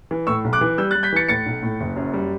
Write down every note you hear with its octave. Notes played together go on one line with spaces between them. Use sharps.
E3
A2 C#6 E6
B1
D6 F#6
E3
G3 E6 G6
F#6 A6
G3
G6 B6
E3 A6 C#7
A2 A6 C#7
B1
A2
F#1
F#2
G3